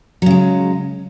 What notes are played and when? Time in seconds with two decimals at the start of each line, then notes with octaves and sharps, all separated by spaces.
0.22 F#3
0.26 C#3
0.31 G#3